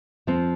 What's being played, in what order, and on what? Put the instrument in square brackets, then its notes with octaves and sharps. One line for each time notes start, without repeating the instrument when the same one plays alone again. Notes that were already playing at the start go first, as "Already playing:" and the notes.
[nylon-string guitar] F2 F3 C4